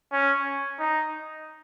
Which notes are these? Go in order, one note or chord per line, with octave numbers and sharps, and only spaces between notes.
C#4
D#4